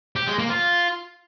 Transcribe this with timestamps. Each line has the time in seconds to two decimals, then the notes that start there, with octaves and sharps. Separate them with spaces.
0.16 G4
0.27 G#3
0.39 A#3
0.50 F4